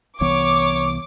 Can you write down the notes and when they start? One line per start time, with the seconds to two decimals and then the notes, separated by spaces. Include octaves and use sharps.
0.21 C2 E3 B3 C#5 D6